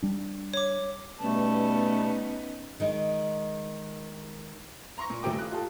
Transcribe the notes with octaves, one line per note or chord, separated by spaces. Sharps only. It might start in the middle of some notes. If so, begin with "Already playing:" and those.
G3 D4
C#5 D6
B2 G3 A3 B3 C#4 D#4 A5
D#3 G#3 D#4
A#5 C6 C#6 A#6
A#2
D#1 F#3 A3 A#3 G5 D6
F4 D#6 F#6
F4 G4 A4